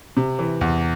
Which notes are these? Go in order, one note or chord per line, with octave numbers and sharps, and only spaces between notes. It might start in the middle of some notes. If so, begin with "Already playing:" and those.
C3
E3
E2